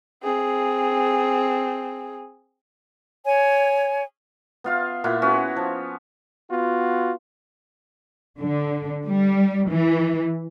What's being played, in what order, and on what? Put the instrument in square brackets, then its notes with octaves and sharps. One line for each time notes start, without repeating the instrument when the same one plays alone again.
[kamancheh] C4 G#4
[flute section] C#5 G#5
[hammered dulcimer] B3 F4 F5
A#2 E4 F4 F#5
B3 C#4 F#4
F3
[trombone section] B3 F4 F#4
[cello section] D3
G3
E3